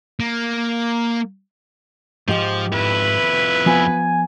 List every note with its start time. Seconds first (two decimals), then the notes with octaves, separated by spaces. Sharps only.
0.20 A#3
2.28 G#2 F3 G4
2.73 F2 E4 B4
3.66 F3 B3 F#5 G#5